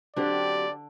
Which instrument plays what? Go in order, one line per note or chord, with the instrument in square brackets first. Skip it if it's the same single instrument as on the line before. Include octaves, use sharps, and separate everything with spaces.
[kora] D3 D4 [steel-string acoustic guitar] F#3 C4 G4 [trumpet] D5